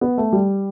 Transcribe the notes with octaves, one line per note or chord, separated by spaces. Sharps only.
B3
A3
G3